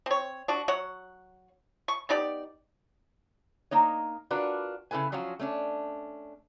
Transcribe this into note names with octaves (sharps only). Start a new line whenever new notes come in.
C4 C#5
D4 F#4
F#3 C#5 F#5
C#6
B3 D#4 G4 D5
A#3 D#4 C#5
D4 F4 F#4 A#4 B4 D5
C#3 E4 A4 B4 G#5
F3 F#3 C#4 F4 F#4
A3 C#4 D4